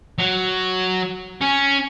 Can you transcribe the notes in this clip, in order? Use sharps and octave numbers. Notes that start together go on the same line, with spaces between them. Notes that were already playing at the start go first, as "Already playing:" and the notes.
F#3
C#4